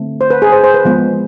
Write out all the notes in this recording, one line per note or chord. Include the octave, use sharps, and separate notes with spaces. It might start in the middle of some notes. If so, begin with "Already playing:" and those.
Already playing: D3 A3 C4
C5
B4
G#4
C5
C5
B4
F3 G#3 B3